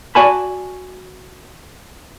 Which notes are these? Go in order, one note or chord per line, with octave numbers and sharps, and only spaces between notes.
F#4 D5 G#5 A5 B5